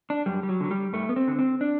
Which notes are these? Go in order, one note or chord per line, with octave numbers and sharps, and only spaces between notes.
D4
F#2 G3
G3
F#3
D3 F#3
G3
G2 A3
B3
C4
D3
C4
D4